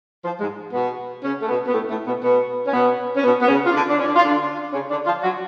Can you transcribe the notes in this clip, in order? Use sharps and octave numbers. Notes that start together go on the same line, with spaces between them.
F3
G#2 G#3
B2 B3
C#3 C#4
A3
B2 B3
B3
A2 A3
A2 A3
B2 B3
B2 B3
C#4
B2 B3
C#4
B2 B3
B3
C#3 C#4
F4
D3 D4
D3 D4
C#4
D3 D4
F4
D3 D4
C#3 C#4
D3 D4
F3 F4
F#3 F#4